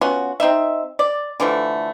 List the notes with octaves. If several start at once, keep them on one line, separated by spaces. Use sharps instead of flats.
B3 C#4 F4 F#4
C4 D#4 D#5 E5
D5
D3 E3 F3 A3